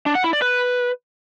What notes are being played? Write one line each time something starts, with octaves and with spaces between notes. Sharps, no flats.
D4
F#5
E4
D5
B4